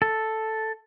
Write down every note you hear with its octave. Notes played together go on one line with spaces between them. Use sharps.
A4